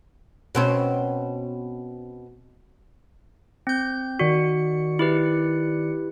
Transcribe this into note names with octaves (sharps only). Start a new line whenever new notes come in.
B2 C4 C#4
C4 G6
D#3 F#4 D5 C#7
E4 G4 B4